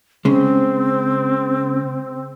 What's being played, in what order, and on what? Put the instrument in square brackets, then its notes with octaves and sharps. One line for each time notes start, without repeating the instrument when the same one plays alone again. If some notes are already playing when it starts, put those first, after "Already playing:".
[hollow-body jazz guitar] C#3 G#3 [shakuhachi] C4